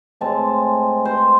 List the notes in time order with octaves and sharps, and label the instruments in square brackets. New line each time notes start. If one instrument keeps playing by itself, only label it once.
[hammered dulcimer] A2 G#3 C4 A5
C5